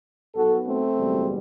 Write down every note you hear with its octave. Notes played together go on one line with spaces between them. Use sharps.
B1 B2 F#3 F#4 A4
A3 C4
F#1 E2 B2 G3